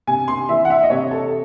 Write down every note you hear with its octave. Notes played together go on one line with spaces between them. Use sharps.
C3 G#5
C6
E3 E5
F#5
E5
D#5
C3 C#5
A4